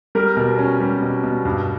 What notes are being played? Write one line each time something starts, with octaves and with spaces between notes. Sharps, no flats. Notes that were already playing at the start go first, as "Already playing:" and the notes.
G3 A#4
B2
C#4
G3
B2
B2
G2